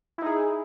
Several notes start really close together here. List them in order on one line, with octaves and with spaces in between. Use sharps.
E4 D#4 G#4